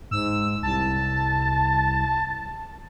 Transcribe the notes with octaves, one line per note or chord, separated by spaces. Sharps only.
G#2 E6
C2 A5